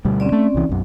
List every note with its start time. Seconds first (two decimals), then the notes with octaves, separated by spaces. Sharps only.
0.05 D2 B2 G3
0.20 C4 C#4 D5
0.32 A3
0.54 C2 E3
0.69 B1 F#2